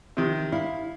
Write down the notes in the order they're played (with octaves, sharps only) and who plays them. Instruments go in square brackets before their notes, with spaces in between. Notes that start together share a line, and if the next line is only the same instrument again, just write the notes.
[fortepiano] C3 D#3
[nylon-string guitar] E4 [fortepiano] F5